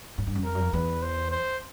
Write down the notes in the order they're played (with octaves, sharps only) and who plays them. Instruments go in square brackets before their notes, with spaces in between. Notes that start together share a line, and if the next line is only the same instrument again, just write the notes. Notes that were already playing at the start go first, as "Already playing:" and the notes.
[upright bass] G#2
G2
F#2
[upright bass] F2 [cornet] A#4
[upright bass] F#2
F2
[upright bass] E2 [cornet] B4
[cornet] C5
C5